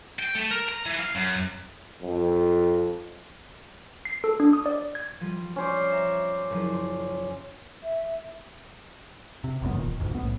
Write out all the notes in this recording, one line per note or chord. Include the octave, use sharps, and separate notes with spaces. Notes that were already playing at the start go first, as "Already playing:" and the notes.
G5
A3
A#4
A#5
E3
F5
F#2
F2
C7
A4
D4
D#6
D5
G#6
F3 G3
C#4 C5 D5
E5 A#5
F#1 F3
E5
C3
G1 C2 F#2 B3
D1 A#2 D#3
G1 D2 G#2
C#3 B3
B1 A2